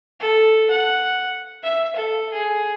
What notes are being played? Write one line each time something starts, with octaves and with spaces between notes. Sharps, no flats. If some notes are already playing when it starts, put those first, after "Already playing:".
A4
F#5
E5
A4
G#4